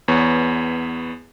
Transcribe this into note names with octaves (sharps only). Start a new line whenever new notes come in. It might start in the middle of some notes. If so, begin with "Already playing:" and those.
E2 B3 C#5